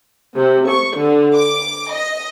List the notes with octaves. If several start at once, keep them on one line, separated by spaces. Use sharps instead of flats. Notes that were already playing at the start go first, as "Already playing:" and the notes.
C3
C#6
D3
D6
D#5